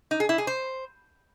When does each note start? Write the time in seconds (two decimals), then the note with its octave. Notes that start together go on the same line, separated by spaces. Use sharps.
0.11 D#4
0.20 G#4
0.29 E4
0.38 G#4
0.47 C5